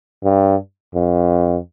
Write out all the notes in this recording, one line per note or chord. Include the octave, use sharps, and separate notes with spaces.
G2
F2